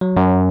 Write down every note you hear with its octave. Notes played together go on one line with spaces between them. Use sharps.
F#3
F#2